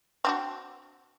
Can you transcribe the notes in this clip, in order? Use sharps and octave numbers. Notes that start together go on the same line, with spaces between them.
C4 D4 F#4